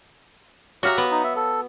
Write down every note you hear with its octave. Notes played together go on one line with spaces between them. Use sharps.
F#3 F#4 G4 E5 F5 A#5
B3
D#4
E5
A4